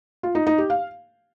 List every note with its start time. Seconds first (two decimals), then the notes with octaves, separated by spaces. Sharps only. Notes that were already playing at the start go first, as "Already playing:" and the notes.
0.23 F4
0.35 D#4
0.47 D#4
0.58 G4
0.70 F5